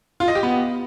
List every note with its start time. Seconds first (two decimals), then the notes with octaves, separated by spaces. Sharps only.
0.20 F4
0.28 D#5
0.35 G4
0.43 B3